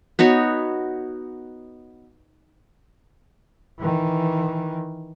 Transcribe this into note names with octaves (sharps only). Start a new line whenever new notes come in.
B3 D#4 F#4 C#5
D#3 E3